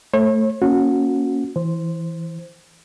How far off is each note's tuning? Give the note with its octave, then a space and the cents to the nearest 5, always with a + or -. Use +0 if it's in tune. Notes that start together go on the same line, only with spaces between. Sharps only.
A3 +5 C#5 -40
A#3 +0 C#4 +0 F#4 -25
E3 +0 C5 +0